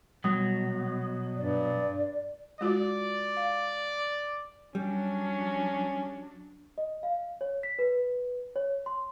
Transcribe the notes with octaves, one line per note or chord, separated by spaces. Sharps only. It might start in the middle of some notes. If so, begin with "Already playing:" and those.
B2 F#3 G3 D#6
G2 D5
G#3 F4 F#4 D5
F5
F#3 G3 C#4 D4
D#5
F5
C#5
B6
B4
C#5
C6